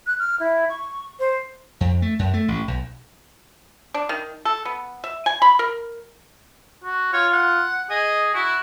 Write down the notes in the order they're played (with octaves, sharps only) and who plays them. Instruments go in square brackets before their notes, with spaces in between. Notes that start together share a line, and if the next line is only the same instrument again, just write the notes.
[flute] F#6
F6
E4
C#6
C5
[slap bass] F2
A3
F#2
A3
A1
B1
[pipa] D4
D#3
A4
B3
E5
G#5
B5
A#4
[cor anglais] F#4
[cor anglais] F4 [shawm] C#5
[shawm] F#5
[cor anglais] G#4 [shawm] D#5
[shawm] E4 [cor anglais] F#4